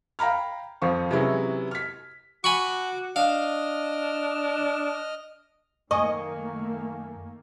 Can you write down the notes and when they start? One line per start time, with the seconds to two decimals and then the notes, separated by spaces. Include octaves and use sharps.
0.19 F5 G5 A#5 B5 F6
0.82 F2 F3 C4 C#6
1.11 C3 E3 F#3 G#3 C#4 E4
1.71 F6 B6
2.44 F#4 G#5 B5 C#6 D6
3.16 D4 D#5 F5 F6
5.91 F#2 D#3 A3 A#3 D#5 G#5 C#6